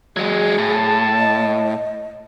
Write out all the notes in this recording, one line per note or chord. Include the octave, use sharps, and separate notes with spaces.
F#3 G#3 G#4
A2 A5
D#5